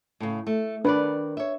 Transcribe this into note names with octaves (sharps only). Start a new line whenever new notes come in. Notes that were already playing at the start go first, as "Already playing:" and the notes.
A2 C#3
A3
D#3 D4 A#4 B4 D5
C#5 E5